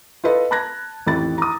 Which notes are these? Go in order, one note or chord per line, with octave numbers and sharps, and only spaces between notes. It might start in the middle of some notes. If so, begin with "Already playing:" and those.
F4 A4 B4 D#5
A5 B5 F#6 G#6 A#6
A1 F2 D#3 E4 B5 A6
A#5 D#6